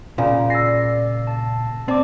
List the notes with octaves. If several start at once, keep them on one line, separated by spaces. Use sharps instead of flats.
A#2 C#3 F4 F5 G#5 A#5
D5 E6 A#6 C7
A5
C4 D5 A5 D6